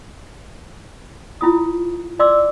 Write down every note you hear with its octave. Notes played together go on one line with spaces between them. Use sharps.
E4 F4 D#6
D5 C6 D6 E6